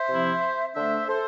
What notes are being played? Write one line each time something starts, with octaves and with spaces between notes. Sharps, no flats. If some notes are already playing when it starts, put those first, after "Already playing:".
Already playing: C5 E5
C3 F3 C4 E4
D3 A3 D4 C5 E5
A4 C5